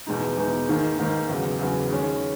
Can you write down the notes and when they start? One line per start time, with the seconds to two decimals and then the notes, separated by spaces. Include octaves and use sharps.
0.07 E2 B2 G#3 D#4
0.37 E2 B2 G#3 D#4
0.68 G#2 D#3 A#3 D#4
0.98 G#2 D#3 A#3 D#4
1.29 E2 C#3 F#3
1.59 E2 C#3 F#3
1.90 D#3 G#3 C#4